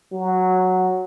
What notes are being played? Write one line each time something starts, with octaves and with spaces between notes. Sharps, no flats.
F#3